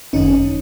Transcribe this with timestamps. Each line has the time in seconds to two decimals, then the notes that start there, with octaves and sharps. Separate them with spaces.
0.13 G1 F#2 D#3 C#4 D#4